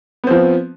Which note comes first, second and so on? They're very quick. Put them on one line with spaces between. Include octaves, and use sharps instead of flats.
B3 C4 F3